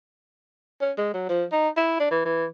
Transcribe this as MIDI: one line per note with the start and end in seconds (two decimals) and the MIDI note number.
0.82 0.92 61
0.98 1.12 56
1.14 1.26 54
1.29 1.44 53
1.52 1.69 63
1.77 1.96 64
2.00 2.09 62
2.11 2.22 52
2.25 2.46 52